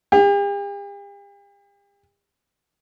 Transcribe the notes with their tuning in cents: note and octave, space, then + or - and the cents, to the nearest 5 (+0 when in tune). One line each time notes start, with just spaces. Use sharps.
G4 +45